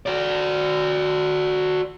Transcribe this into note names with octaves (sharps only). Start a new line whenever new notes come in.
F#4 D5